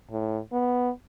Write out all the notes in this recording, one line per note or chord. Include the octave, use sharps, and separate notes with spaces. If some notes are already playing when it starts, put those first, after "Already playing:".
A2
B3